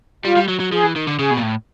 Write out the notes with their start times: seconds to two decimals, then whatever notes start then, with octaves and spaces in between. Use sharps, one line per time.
0.25 G3 F4
0.36 G3
0.48 F#3
0.60 F#3
0.72 F3 G#4
0.84 E3
0.96 D#3
1.07 D3
1.19 C#3 G#4
1.31 B2
1.37 A#2
1.43 A2